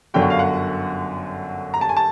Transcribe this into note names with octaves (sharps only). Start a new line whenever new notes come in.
G1 F#2 D3 F#3 G5
F#5
F5
F#5
A#5
A5
G#5
A5